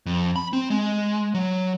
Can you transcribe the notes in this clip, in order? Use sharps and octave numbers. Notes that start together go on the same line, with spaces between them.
F2
B5
C4
G#3
F#3